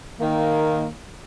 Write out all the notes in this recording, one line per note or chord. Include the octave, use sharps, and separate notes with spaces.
D#3 A#3